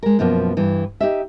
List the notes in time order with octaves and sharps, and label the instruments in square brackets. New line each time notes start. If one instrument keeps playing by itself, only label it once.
[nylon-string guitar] G#3 A#4
F#2 B2 F3 A#3 B3
G2 E3
D#4 G4 E5